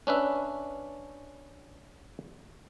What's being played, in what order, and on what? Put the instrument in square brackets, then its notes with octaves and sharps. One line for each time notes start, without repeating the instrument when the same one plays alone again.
[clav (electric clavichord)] C#4 D4 B4 E5